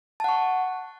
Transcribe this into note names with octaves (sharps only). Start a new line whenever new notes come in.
F#5 A5 C#6